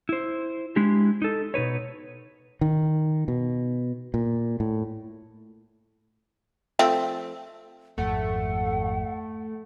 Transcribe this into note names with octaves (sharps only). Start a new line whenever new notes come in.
E4 C5
G#3 D4 E4 G4
D#4 A4
B2 D#4 B4 C#5
D#3
B2
A#2
A2
F3 A3 C4
G#1 F2 A3 F#5